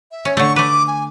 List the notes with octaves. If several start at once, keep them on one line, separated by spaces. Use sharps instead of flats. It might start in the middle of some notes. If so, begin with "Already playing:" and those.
E5
C#4
D3 A3 C#6
A3 B4 D6
G#5